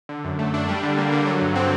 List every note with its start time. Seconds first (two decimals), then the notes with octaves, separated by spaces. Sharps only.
0.09 D3
0.24 F#2
0.39 A3
0.54 D4
0.69 G3
0.83 D3
0.97 A#3
1.12 D3
1.27 F#3
1.41 G2
1.56 C4